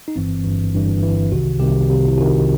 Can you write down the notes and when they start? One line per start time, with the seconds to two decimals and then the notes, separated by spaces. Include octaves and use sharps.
0.08 D#4
0.16 G1 G2 E3 C4
0.44 G1 G2 E3
0.74 G1 G2 E3
1.03 G1 G2 E3
1.31 C2 C3 D#3 F#4
1.60 C2 C3 D#3 G4
1.88 C2 C3 D#3
2.08 E4
2.17 C2 C3 D#3 F#4